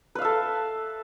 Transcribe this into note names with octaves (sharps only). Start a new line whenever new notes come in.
A4 B4 E5 F5